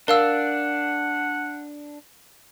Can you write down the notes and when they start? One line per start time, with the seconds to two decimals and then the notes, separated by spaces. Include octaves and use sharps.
0.08 D4 A#4 F5 F#5 E6